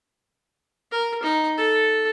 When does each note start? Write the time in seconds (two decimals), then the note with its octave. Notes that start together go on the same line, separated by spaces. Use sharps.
0.92 A#4
1.23 D#4
1.57 A4